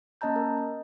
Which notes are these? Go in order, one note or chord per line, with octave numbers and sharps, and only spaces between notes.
A#3 C#4 D#5 A5 A#5 G6
A#4
D#5